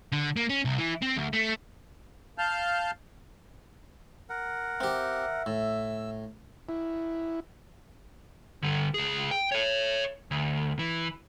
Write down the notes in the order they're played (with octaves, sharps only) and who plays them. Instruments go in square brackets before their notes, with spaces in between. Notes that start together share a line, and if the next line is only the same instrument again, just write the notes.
[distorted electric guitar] D3
A#3
C#4
C2
E3
C4
D2
A3
[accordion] F5 A5 F6 G6
[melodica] A#4 F#5
[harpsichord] C4 G4 [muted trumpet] E5
[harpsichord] A2 [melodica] E6
[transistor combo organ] E4
[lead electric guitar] D3 G3
C#2 G#4
G5
A4 C#5
D2
E3